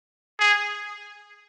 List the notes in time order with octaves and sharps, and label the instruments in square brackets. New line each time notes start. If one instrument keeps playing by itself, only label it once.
[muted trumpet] G#4